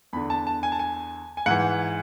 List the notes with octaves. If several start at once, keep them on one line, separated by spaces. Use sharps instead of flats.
E2 D3 B5
A5
A5
G#5
A5
G#5
G#5
G#2 E3 F#5